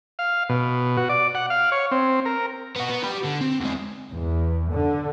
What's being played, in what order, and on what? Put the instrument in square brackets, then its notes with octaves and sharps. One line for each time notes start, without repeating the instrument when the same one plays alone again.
[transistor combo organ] F5
B2
F#4
D5
F#5
F5
C#5
C4
A#4
[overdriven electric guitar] B3 F#4
B3
G4 B5
D3
C4
E2 G#3
[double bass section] E2
D3